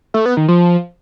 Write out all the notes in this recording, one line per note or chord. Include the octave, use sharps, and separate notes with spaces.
A3
B3
D#3
F3